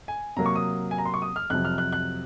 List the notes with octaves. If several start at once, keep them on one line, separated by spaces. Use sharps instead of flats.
G#5
C3 F#3 A#3 A#5
C#6
D#6
G#5
A#5
C6
C#6
D#6
F6
F2 C3 F#3 F#6
F6
F#6
F#6